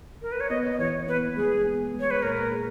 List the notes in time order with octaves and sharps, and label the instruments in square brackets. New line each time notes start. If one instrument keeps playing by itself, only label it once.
[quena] A#4
B4
C#5
[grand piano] B3 [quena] D#5
[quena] D#5
[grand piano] E3 [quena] C#5
[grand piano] B3 [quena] B4
[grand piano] G#3 [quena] G#4
[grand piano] B3
G#3
[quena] C#5
B4
[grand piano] A#2 [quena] A#4
[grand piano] G#4